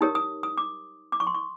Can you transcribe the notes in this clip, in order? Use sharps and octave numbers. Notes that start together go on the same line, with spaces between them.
D#4 G4 A#4 C#5 D#6
D#6
D#6
D6
D6
C#6
C6
C#6